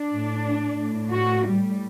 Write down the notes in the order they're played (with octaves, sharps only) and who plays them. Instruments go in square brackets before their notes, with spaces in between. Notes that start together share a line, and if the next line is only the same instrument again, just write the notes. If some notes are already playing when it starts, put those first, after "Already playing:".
Already playing: [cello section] D4
A2
A2
F#4
A2 G3